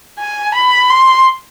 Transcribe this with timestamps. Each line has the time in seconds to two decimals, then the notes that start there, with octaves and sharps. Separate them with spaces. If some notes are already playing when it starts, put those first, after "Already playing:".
0.19 G#5
0.55 B5
0.90 C6